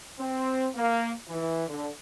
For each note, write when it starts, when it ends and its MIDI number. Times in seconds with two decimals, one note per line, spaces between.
0.19 0.66 60
0.75 1.11 58
1.29 1.64 52
1.68 1.88 50